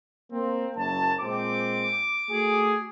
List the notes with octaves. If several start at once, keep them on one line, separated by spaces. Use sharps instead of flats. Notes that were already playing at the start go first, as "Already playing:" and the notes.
A#3 C4
F#1 F#2 A5
A#2 G#3 C4 D6
A3 F#4 G#4